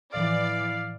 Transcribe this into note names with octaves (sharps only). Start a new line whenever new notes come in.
A2 E3 F3 D5 F5